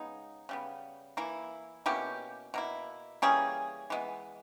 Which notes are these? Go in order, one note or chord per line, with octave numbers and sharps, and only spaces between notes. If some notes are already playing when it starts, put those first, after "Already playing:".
Already playing: C#3 G#3 B3 D#4
C#3 G3 B3
E3 A#3 E4
B2 A#3 C#4 E4 G4
B2 A#3 E4
E3 G3 A#3 C#4 G#4
E3 G#3 B3